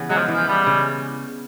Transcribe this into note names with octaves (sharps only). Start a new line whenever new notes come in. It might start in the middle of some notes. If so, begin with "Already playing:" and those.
Already playing: C#3 E3 B3
F#3 G#3
F3
E3 F3
G3 B3
C#3